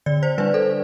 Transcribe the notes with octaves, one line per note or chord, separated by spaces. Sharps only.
D3 D5
C5
G3 D4 B4
A4